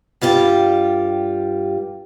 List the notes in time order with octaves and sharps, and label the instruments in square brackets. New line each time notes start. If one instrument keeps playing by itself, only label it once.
[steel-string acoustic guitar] G2 G3 F4 G4